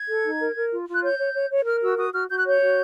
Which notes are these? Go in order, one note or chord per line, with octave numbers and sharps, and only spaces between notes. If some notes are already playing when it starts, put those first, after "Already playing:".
Already playing: G#6
A4
D#4
A#4
A#4
F4
F4
F#6
C#5 G6
C#5
C#5
C#5
A#4 F6
F#4 E6
F#4 D#6
F#4 F6
F#4 G6
F#6
C#5 G6
F#4